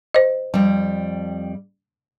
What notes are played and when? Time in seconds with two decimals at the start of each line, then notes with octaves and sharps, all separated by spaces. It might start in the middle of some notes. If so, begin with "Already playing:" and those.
0.14 C5 D#5
0.54 F2 G3